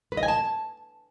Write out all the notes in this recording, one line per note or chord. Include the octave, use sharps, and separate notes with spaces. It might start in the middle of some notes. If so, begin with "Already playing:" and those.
B4
D#5
G#5
A5